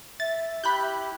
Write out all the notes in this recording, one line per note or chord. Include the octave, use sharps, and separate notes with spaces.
E5 A6
E4 G4 B5 F#6 G6